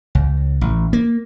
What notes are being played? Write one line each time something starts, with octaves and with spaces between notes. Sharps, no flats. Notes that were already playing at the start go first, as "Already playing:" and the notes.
C#2
A1
A#3